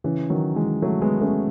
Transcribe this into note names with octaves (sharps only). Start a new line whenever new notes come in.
C#3 E3
D#3 F#3
E3 G#3
F#3 A3
G#3 B3
A3 C#4